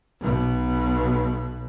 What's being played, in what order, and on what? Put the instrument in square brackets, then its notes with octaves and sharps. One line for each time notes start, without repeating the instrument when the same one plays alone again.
[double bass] B1 B2